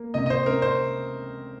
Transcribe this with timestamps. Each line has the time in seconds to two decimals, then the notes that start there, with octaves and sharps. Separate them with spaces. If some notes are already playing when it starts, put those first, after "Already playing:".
Already playing: A#3
0.14 C3 D#5
0.26 D#5
0.30 C5
0.46 C4 A#4
0.62 C5